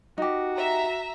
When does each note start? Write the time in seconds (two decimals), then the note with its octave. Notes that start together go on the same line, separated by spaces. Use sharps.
0.18 D#4 F#4 G4
0.58 E5 A#5